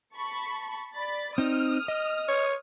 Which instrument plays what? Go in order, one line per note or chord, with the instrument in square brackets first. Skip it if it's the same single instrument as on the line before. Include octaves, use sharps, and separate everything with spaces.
[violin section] A5 B5 C#6
D5 B5 A6
[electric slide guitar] C4 D#4 [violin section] D#6 F6
[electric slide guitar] D#5
[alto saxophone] C#5